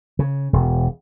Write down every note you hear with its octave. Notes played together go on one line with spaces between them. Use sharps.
C#3
E1